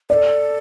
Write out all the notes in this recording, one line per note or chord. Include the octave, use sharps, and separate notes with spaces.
A4 B4 D5